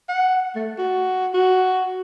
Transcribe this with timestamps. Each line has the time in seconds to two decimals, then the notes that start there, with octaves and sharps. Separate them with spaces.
0.09 F#5
0.55 A3
0.79 F#4
1.34 F#4